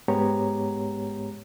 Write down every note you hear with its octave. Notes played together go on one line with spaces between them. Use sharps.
G#2 G#3 B3 G4 C#5 A#5